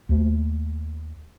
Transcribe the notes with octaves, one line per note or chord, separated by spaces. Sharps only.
D#2 A3